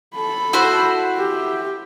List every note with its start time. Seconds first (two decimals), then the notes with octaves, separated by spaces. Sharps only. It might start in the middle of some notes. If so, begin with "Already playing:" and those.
0.15 A4 B5
0.53 E4 F#4 C5
1.17 G4